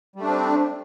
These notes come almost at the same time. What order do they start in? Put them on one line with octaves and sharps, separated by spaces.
G3 A3 D4 C4